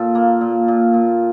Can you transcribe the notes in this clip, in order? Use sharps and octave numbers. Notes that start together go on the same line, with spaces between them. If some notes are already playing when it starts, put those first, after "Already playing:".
Already playing: A#2 F4 A4
A#3
A#2
A#2
A#2